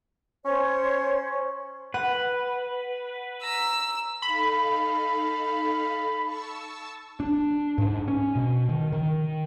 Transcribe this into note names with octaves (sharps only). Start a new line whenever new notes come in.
C#4 C5 C#5
B4 F#5
A#5 E6
D#4 A4 F5 B5
A5 C#6 E6
D4
G#2
C#4
B2
D#3
D#3